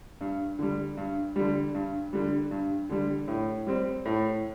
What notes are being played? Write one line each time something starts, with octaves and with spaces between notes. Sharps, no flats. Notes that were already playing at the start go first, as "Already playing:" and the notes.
G2
D3 G3
G2
D3 G3
G2
D3 G3
G2
D3 G3
A2
G3 C4
A2